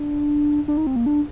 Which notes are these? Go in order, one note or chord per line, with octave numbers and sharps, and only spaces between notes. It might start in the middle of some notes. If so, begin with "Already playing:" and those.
Already playing: D4
D4
D#4
C4
A#3
D4